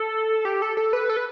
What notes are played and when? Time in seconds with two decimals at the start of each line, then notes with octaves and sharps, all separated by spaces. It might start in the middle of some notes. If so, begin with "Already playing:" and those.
Already playing: A4
0.45 G4
0.62 A4
0.77 A4
0.93 B4
1.09 A4
1.17 B4